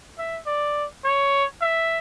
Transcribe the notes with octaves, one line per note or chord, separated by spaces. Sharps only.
E5
D5
C#5
E5